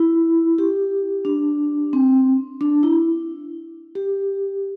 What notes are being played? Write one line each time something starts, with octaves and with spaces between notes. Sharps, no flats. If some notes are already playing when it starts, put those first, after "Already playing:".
Already playing: E4
G4
D4
C4
D4
E4
G4